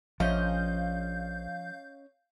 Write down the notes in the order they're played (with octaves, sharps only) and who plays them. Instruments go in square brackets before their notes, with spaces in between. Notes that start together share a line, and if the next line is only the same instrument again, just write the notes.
[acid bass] A#1 [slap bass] F3 [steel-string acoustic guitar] C#4 D#5 [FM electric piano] F5 G6